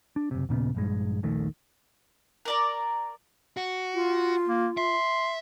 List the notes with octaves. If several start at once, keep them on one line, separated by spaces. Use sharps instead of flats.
D4
F#1 C3
D#2 A#2 C#3 B3
A#1 G2 G#3
D#1 A#1 D#3 A3
A#4 D5 A#5
F#4
F4
A#3
E5 C6